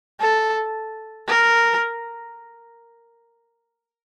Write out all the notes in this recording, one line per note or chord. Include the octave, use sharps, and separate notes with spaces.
A4
A#4